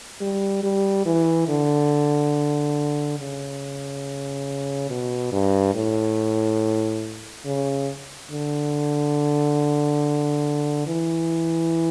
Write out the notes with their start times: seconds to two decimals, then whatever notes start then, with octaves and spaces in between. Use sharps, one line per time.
0.21 G3
0.63 G3
1.06 E3
1.48 D3
3.19 C#3
4.90 B2
5.33 G2
5.75 A2
7.45 C#3
8.31 D3
10.87 E3